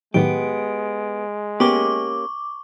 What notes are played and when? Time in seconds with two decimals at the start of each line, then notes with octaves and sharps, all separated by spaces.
0.14 A2 D#3 F#3 G#3 B3 G4 D7
1.60 A#3 B3 C#4 G4 C#6 D6